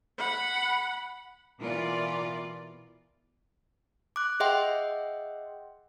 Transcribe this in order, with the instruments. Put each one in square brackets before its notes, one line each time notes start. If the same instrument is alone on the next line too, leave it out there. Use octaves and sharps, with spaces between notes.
[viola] F#5 B5
[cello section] B2 E3 F4 A#4 D5
[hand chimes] D6 F#6
G#4 D#5 E5 F#5 G5 C6